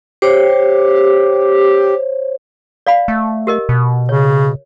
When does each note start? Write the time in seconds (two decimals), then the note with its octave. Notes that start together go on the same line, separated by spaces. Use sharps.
0.22 G4 C5 C#5
2.87 D5 F5 B5
3.08 A3
3.47 G4 A#4 D#5
3.69 B2
4.09 C#3 C#5